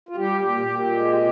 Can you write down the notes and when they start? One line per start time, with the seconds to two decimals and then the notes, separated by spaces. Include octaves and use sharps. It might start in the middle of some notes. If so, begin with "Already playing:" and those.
0.09 F4
0.16 G3 G4
0.41 A#2 G4
0.66 A#2
0.79 G4
0.92 G#3
1.12 F4
1.16 C3 G4